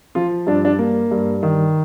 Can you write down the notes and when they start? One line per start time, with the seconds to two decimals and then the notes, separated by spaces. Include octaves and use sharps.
0.15 F3 F4
0.47 G2 D4
0.65 D4
0.79 A#3
1.11 G2
1.43 D#3